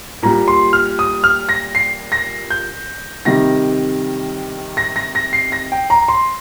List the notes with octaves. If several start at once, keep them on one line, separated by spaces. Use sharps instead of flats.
A#2 G3 A#5
C6
F6
D#6
F6
A#6
C7
A#6
G6
C3 D#3 G3 A#6
A#6
A#6
A#6
C7
A#6
G5
A#5
C6